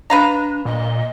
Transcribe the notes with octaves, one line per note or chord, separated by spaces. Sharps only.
D4 B4 F5 A#5
A#2 D#5